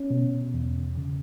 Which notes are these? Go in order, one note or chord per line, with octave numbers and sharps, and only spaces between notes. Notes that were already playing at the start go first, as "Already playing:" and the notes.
Already playing: C#4
B2
E2
C#3